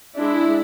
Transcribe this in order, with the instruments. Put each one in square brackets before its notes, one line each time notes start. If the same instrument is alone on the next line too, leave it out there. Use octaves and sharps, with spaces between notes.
[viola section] G#3 D4 E4